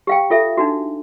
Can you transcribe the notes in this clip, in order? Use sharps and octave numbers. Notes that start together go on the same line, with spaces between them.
G4 F5 G5
F4 A4 E5
D4 D#4 F#4